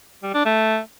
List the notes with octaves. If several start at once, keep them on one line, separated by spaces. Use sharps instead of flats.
G3
D4
A3